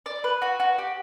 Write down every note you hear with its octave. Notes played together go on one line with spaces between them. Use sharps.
D5
B4
F#4
F#4
G4